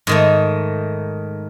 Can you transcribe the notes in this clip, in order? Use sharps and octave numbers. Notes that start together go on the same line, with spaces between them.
G#2 D#3 A3